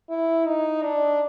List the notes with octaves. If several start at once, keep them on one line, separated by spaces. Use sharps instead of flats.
E4
D#4
D4